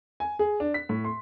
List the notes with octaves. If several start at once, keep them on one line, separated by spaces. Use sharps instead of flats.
G#5
G#4
D4
B6
A2
C6